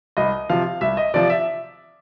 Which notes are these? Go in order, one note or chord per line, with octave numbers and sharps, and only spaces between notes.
C2 D#5
C3 F3 F5
C2 E5
D#5
C3 F3 D5
E5